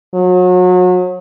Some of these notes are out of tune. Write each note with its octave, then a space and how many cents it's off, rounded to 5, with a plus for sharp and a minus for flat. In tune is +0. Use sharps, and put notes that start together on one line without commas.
F#3 -35